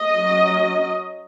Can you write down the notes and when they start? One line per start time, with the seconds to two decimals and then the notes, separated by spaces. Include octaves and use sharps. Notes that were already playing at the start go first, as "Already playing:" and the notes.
Already playing: D#5
0.14 F#3 C#4